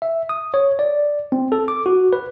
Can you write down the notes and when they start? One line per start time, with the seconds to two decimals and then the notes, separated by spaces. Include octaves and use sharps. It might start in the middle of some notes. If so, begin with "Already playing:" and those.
0.02 E5
0.29 D#6
0.54 C#5
0.79 D5
1.32 C4
1.52 A4
1.68 D6
1.86 F#4
2.13 B4